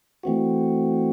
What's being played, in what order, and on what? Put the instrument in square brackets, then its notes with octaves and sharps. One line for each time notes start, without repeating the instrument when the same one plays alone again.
[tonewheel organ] E3 A3 C4 F#4